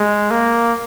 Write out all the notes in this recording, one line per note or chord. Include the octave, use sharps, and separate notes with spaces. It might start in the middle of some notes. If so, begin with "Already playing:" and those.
Already playing: G#3
A#3